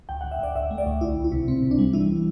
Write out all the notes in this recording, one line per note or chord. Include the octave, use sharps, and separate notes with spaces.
D2 G5
D2 F#5
E5
D2 D5
D2 E5
A3
D5
D2
C2 E4
C2
E4
C3
C3 C4
C3
D4
G3
E3 E4